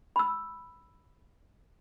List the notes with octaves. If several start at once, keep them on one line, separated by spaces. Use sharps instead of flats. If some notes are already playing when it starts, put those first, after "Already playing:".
B5 E6